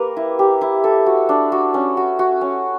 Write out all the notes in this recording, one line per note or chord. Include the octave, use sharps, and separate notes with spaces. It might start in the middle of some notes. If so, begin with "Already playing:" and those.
Already playing: A#3 G4 A#4 B4
E4
G4
E4
A4
F#4
D4
F#4
C#4
F#4
F#4
C#4